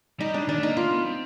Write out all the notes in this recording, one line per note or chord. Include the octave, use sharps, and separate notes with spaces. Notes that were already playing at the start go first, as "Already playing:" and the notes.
G3 D#4
D4
D#3 D4
A3
A#3 D#4
A#3 F4
B3
C4